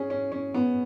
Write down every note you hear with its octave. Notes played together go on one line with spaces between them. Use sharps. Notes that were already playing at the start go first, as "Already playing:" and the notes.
Already playing: C#4 G#4
C#4
C#4
B3